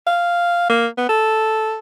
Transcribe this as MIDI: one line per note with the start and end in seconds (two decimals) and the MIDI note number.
0.07 0.67 77
0.69 0.87 58
0.98 1.07 59
1.09 1.78 69